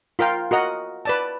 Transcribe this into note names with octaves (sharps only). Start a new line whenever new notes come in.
F4 A#4 F5 G5
F#4 A#4 D#5 F#5
B4 D5 A5